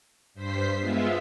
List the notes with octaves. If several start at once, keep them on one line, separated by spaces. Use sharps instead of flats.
G2 C5 B6 C7
G#3 B3 F4 E5